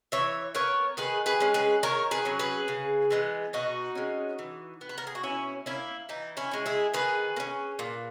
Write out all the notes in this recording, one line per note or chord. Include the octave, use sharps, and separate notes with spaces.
E3 C#5 E5
B3 A#4 C#5
D#3 G#4 B4
G#4 B4
G#3 C#4
G#4 B4
D#3 A#4 C#5
G#4 B4
F#3 C#4
G#4 B4
C#3
E3 G#3 B3
B2 D#4 F#4
G#3 C#4
E3
B3
B4
A#4
G#4
F#4
B2 C#4 E4
A#3 C#4 E4
E3 D#4
C#4 E4
G#3 C#4
E4 G#4
D#3 G#4 B4
A#3
C#4
A#2